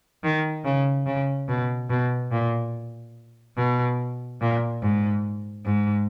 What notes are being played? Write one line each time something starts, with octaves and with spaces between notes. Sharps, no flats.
D#3
C#3
C#3
B2
B2
A#2
B2
A#2
G#2
G#2